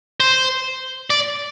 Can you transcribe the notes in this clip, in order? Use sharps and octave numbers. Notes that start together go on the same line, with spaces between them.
C5
D5